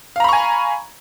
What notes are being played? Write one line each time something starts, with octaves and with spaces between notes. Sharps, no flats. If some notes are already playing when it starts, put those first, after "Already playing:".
F5 G#5 A#5 B5 C#6